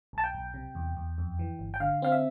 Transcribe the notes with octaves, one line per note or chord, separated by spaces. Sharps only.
B1 A5
G5
B1
C3
E2
E2
F2
E3
G1
G5
D3 F5
C4 F5
E5